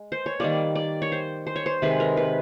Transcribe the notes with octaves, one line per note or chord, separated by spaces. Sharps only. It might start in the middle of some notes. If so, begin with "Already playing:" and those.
Already playing: G#3
C5
C#5
D#3 G3 A#3 D5
D5
C#5
C5
C5
C#5
C5
C3 D#3 G#3 B4
A#4
B4